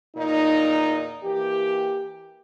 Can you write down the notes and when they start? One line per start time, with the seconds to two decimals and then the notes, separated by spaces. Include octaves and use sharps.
0.17 E2 A#2 D#4
1.23 E3 A#3 G4